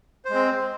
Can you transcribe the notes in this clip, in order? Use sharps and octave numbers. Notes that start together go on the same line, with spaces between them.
G#3 C4 C5